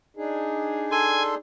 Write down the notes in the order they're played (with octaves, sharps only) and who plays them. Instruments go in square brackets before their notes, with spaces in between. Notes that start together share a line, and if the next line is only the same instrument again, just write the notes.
[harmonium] D4 D#4 G#4
[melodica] A4 C6 [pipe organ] G#5